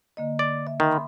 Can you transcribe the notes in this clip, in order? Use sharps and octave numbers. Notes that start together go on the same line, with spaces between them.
D3 A#3 D#5
D5
E5
D#3 E5 C6
B5 C6 D6